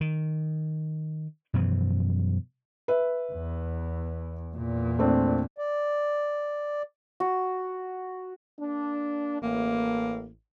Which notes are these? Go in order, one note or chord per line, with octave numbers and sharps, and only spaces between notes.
D#3
F#2 B2 E3 F3
B4 E5
E2
E2 A#2
A3 C4 D4
D5
F#4
A#3 D4
A1 A#3